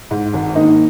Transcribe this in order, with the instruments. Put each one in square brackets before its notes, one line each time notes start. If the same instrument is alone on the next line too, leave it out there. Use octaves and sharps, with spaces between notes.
[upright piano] G#2
G#1
[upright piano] A#3 [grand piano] D#4 D#5